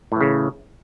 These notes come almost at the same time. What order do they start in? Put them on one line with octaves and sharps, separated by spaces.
A2 E3 C#3